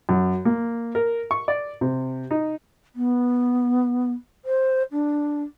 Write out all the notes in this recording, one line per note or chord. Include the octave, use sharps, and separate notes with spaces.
F#2
A#3
A#4
C#6
D5
C3
D#4
B3
C5
D4